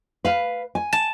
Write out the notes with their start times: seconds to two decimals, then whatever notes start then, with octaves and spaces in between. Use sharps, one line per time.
0.25 B4 F5
0.75 G#5
0.93 A5